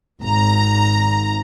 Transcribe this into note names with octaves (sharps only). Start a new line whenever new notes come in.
G#1 A#5